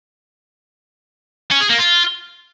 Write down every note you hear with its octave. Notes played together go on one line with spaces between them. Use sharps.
C#4
G#4
A#3
F4